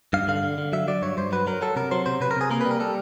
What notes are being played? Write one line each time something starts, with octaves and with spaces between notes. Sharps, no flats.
G2 F5
D3 F5
D3
D3
F#3 E5
F#3 D5
G2 C#5
G2 C5
F#3 B4
F#3 A#4
F#3 A4
C3 A#4
F#3 C5
C3 C5
C3 B4
A#4
C3 G#4
A#3 A#4
B4
G3
A#4
G3 A4